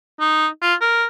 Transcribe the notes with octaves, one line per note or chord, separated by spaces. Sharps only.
D#4
F4
A#4